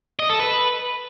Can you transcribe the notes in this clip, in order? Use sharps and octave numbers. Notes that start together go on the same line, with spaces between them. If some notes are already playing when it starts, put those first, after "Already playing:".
D#5
A4
B4